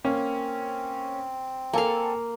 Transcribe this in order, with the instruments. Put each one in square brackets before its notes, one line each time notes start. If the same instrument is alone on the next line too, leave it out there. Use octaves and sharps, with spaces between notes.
[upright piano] A#3 C#4 [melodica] C4
[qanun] A#3 F5 [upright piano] A4 G#5